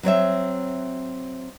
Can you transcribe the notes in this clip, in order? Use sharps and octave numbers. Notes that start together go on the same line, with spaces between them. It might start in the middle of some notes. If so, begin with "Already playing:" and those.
F#3 C4 C#5 E5